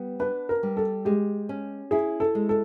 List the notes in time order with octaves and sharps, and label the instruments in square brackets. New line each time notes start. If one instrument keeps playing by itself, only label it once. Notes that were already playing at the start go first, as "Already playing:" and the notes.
Already playing: [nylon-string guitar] G3 B3
[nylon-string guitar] D4 [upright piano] B4
[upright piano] A#4
[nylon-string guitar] G3
[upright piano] A4
[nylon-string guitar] G#3 [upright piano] G4
[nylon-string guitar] C#4
[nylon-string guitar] E4 [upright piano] G#4
[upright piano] A4
[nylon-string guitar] G#3
[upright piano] A4